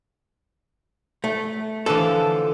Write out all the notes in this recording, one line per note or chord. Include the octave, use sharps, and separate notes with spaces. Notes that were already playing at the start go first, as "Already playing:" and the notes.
A3
D3 E3 F3 A4